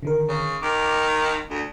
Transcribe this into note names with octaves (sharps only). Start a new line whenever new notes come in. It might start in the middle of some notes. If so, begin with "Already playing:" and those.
D3 D#3 A#4
C#3
D#3 D6
D2